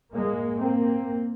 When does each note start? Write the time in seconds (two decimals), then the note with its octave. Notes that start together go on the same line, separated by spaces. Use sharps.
0.14 A2 G#3 A#3
0.61 A2 A#3 C4